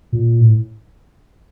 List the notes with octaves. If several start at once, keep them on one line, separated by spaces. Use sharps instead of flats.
A#2
A2